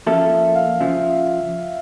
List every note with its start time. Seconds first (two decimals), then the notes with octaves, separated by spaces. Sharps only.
0.07 F3 A#3 C#4 F4 A4 E5
0.55 F5
0.80 C#3 F3 E5